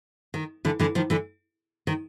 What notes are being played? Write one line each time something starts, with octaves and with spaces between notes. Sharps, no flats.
D#3
D3 E3
D3 E3
D#3 F3
D3 E3
D#3